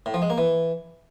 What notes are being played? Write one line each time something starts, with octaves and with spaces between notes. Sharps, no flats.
A2
F3
G#3
A#3
E3